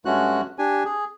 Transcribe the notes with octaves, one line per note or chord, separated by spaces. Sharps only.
G2 G#3 A3 C#4 F#4 F#6
D4 G4 G#5
G#4